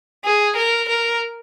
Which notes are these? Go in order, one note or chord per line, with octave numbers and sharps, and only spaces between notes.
G#4
A#4
A#4